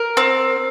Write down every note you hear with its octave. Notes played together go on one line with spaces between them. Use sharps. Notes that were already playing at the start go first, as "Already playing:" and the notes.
Already playing: A#4
C4